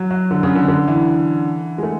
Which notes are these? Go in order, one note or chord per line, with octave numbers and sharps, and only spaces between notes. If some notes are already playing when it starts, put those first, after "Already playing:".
Already playing: F#3
F#3
D3
C#3
D3
D3
E3
G#3
A3